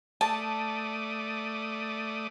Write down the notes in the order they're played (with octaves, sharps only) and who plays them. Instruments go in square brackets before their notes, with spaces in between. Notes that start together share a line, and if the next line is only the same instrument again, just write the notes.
[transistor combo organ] A3 D5 D#6 [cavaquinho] A5